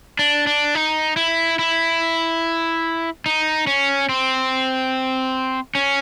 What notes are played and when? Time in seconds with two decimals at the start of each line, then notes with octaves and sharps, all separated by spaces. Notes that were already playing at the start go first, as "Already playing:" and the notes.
0.19 D4
0.47 D4
0.75 D#4
1.17 E4
1.59 E4
3.26 D#4
3.67 C#4
4.09 C4
5.75 C#4